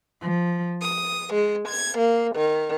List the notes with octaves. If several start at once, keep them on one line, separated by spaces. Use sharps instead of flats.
F3
D#6
G#3
G#6
A#3
D#3